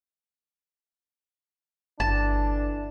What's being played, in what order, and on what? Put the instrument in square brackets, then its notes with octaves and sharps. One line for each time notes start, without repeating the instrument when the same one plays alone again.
[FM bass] G1 [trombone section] D3 E3 D4 [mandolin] A5